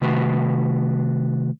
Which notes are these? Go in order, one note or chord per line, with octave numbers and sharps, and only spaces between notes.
C3 D#3 A3 F#4 B4